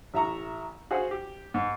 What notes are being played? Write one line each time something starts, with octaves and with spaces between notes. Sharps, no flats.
A1 E5 A#5 C#6
F#4 G#4 C5 F5 F#5
G4
G#2